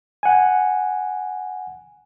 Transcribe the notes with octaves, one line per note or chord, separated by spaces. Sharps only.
F#5 G#5